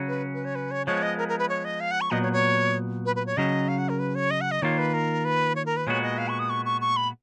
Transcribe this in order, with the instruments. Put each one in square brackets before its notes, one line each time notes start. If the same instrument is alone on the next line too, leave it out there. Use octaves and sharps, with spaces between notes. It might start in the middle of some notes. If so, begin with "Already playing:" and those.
Already playing: [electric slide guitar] C#3 F#3 C#4
[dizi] B4
B4
C#5
B4
C#5
[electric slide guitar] F3 G#3 B3 [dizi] C#5
[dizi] D#5
A#4
A#4
B4
C#5
D#5
F5
F#5
C#6
[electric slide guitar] A#2 F#3 B3 [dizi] D#5
[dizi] C#5
C#5
B4
B4
C#5
[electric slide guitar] C#3 F#3 C#4 [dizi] D#5
[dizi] F5
F#5
A#4
B4
C#5
D#5
F#5
D#5
[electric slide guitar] D#3 A#3 F4 [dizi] C#5
[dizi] B4
A#4
B4
C#5
A#4
B4
[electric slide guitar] A#2 G#3 B3 F#4 [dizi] C#5
[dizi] D#5
F5
C#6
D#6
C#6
C#6
C#6
B5